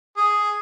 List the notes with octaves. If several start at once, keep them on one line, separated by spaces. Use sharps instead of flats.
G#4